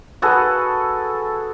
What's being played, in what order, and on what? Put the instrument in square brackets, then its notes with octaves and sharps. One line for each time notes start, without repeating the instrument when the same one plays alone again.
[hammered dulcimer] F#4 G#4 A4 B4